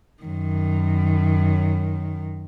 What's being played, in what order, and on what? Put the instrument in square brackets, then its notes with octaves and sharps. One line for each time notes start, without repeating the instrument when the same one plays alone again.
[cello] F#2 D#3